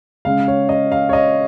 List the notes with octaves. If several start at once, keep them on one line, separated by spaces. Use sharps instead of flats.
C#3 G#3 F5
C#5
D#5
F5
C#5
D#5